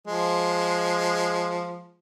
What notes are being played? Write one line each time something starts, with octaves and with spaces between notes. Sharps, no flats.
F3 G#3